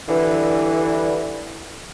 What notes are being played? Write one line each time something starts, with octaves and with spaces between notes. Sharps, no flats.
G2 D3 E3